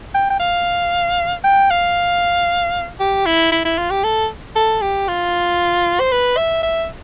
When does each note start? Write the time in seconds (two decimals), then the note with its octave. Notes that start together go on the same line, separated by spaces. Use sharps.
0.14 G5
0.30 G5
0.40 F5
1.44 G5
1.70 F5
3.00 G4
3.26 E4
3.52 E4
3.65 E4
3.78 F4
3.90 G4
4.04 A4
4.55 A4
4.81 G4
5.08 F4
6.00 C5
6.12 B4
6.37 E5
6.63 E5